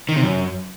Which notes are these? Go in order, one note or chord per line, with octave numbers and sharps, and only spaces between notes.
D#3
C3
F#2